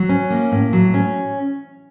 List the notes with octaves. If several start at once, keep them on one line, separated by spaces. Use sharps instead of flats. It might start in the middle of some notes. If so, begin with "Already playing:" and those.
Already playing: F#3
C#4
A#3
A2
F#3
C#4